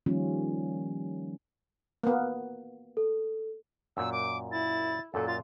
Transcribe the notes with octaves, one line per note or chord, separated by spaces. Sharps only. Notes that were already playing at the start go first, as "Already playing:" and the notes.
D#3 F3 G3 A#3 C#4 F4
A#3 B3
A4
F#2 A#2 E6
D6
E4 A6
F#2 A#2 A4
F4 A6